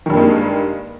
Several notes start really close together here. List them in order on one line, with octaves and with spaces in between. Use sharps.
D#3 G2 A#3 G#3